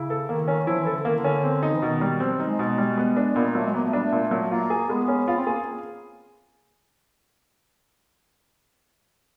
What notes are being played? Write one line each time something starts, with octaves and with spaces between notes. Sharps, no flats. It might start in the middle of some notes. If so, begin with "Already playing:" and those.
Already playing: C#3 E4
A4
D#3 A#3
C#4
F3 E4
E3
A4
D3
D#3 A#3
D3
C#4
C4
D#4
E3
B2 D#3
G3
F3 C4
F#3
D#4
G#3
B2
G3
B3
D4
A#2 B3
A#3
F#3 A3
G#3
A#3 B3
A3
G3 D4
A3
A#2
F#3
A#3 F4
G#4
G#3 B3
C#4
B3 F4
C4
A#3 G#4